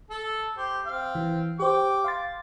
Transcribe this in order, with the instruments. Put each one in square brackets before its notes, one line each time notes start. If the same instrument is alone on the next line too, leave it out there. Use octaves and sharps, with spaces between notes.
[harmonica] A4
G4 C5
C4 F5
[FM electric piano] E3
[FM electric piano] G4 C5 [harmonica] G5 D6
[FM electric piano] F5 C6 A6